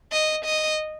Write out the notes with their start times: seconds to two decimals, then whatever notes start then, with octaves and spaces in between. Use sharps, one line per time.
0.12 D#5
0.45 D#5